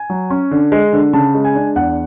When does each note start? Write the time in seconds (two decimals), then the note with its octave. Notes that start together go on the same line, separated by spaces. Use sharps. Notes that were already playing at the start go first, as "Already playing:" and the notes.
Already playing: G#5
0.10 F#3
0.30 C#4
0.51 D3
0.72 G#3
0.93 D3
1.13 C#3 A5
1.34 G#3
1.45 G#5
1.55 D4
1.76 E2 F#5